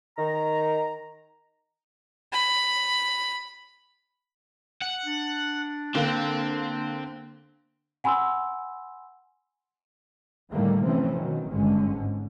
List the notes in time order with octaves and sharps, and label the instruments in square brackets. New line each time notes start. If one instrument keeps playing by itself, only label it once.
[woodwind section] D#3 A#5
[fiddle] B5
[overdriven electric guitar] F#5
[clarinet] D4
[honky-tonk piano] D3 A#3 [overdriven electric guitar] C4
[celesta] F#5 G#5 B5 C6 E6
[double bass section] A2 D3 D#3 G3 A3 A#3
C3 E3 F3 A3 C4 C#4
B2 D#3 F#3
G#1 G2 D3 G#3 C#4
G#2